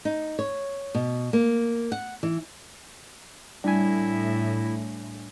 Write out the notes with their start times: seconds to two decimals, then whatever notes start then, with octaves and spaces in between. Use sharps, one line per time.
0.05 D#4
0.39 C#5
0.95 B2
1.33 A#3
1.92 F#5
2.23 E3
3.64 A2 G3 D4 E4 G#5